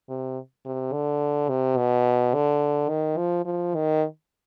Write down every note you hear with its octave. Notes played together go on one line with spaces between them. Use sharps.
C3
C3
D3
C3
B2
D3
D#3
F3
F3
D#3